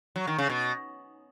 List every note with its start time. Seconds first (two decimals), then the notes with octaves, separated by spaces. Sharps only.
0.16 F#3
0.27 D#3
0.38 C#3
0.49 B2